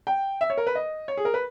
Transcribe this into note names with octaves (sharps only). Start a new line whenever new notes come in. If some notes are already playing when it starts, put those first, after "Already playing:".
G5
E5
C#5
A#4
B4
D#5
C#5
G#4
A#4
B4